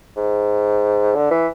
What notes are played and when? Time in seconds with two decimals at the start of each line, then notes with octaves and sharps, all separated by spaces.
0.17 G#2
1.15 D3
1.31 E3